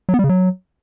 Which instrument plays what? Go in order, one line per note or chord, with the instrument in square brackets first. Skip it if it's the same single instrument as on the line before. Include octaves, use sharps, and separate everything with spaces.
[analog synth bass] F#3
B3
G3
C#3
F#3